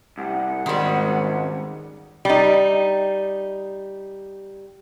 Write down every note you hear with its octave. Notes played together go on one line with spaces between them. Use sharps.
C2 F#5
G#1 C#2 D#3 G3 C6
G3 D#4